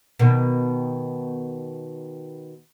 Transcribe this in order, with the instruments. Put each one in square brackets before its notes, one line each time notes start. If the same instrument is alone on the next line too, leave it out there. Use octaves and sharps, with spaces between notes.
[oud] B2 D#3